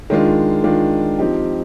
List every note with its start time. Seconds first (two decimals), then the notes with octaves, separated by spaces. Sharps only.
0.10 D#3 G#3 D4 F4
0.64 D#3 G#3 D4 F4
1.19 F3 C4 D#4 G4